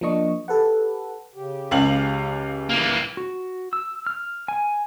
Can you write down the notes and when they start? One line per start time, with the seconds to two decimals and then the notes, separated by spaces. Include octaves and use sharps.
0.01 F3 A#3 D4 D#5 C#6
0.48 G4 A4 B4 F#5
1.35 C#3 G4
1.71 C#2 C#4 F5 F#7
2.69 E3 A#3
3.17 F#4
3.73 E6
4.07 F6
4.48 G#5